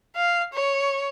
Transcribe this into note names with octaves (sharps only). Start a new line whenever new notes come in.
F5
C#5